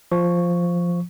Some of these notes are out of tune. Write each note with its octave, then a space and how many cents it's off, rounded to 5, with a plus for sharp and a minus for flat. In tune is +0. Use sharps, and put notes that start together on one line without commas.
F3 +0 C#6 +0